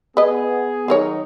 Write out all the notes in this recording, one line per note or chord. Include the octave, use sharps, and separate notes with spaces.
B3 G#4 B4 D#5
D#3 F#3 D#4 G#4 A#4 C#5